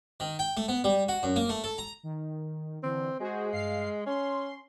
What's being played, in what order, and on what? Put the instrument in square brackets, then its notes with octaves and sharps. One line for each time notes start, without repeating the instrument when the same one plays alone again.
[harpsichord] D#3
G5
A3
B3
G3
F#4
F#2
A#3
A3
A4
A#5
[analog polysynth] D#3
[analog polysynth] D3 E3 [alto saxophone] C4
[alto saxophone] G#3 [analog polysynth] F#4 G#4 C5
[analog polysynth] G2 F5 C7
[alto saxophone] C#4 [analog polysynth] C6